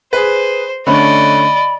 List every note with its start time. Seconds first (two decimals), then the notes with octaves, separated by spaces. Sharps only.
0.13 G#4 B4 C5
0.87 D3 A3 C#4 D5 D#5 B5